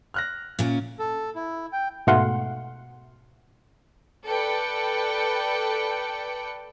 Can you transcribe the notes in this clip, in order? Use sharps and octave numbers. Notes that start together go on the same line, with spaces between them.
F6 F#6 A#6
A#2 C#4
A4
E4
G5
G#2 B2 A3 F5 F#5 C6
A4 B4 D5 G5 C#7